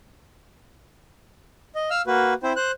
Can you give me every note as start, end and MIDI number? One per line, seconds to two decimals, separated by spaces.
1.75 1.90 75
1.90 2.02 77
1.90 2.02 88
1.90 2.02 89
2.07 2.34 58
2.07 2.34 66
2.07 2.34 71
2.43 2.53 60
2.43 2.53 64
2.43 2.53 72
2.56 2.71 72
2.56 2.71 90